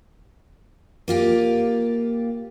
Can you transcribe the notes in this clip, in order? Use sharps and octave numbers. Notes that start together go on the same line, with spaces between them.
A#3 F4 G4